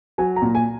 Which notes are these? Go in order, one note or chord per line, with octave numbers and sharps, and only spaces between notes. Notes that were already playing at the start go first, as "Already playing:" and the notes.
F#3 G#5
A#5
A#2
G#5